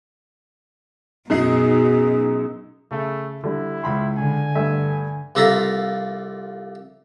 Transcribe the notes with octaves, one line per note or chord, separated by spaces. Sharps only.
F#2 B2 D#4 G#4 C7
C#3 A3
D3 G3 E4
C#2 B5 C6
D3 G#5
G2 A3 E5
C2 A#3 F4 A4 A#5 B5